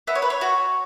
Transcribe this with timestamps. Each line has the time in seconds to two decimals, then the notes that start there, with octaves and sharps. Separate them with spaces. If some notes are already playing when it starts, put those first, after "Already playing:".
0.07 B3 E5
0.15 C#5
0.22 B4
0.30 C#5
0.41 F#4